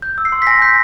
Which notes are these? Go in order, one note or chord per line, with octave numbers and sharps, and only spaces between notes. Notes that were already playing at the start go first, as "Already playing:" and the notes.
G6
E6
C7
C6
B6
G#5 A#6
G6 B6